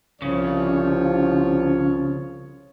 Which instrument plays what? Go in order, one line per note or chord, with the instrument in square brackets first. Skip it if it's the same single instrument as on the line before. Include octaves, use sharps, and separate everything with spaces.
[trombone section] C2 F3 [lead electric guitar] C#3 [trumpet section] F4 C#5